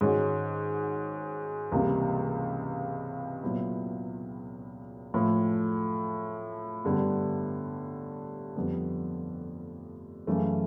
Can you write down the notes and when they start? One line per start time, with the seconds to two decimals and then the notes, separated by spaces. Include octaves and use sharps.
0.01 G#2 D#3 G#3 C#4 F#4
1.72 C#2 C3 E3 G3 A#3
3.43 A#2 F#3 B3 E4
5.14 A2 F3 A3
6.85 G2 D3 G3 B3 D4
8.56 F2 D3 G3 B3
10.27 F#2 C#3 E3 A3